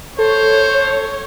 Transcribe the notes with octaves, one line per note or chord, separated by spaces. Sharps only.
A4 C5 C#5